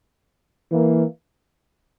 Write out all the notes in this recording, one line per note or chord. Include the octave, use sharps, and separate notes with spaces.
E3 A#3